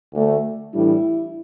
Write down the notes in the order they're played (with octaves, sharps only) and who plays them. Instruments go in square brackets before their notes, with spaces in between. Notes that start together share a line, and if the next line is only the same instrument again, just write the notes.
[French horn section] D2 D3 A3
A2 E3 G3 D4 E4